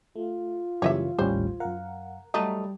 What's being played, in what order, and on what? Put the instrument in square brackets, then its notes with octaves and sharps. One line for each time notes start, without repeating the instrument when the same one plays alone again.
[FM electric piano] A3 [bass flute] F4
[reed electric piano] F#2 C#3 E3 [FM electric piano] G3 A#3 [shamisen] C#5 D#5 E5
[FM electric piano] A1 D#2 A2 [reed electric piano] G3 C#4 [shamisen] C5
[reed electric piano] F#2 F5 [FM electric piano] A#4 F#5
[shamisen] F#3 A3 D#4 [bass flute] G3 [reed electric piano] A5 D#6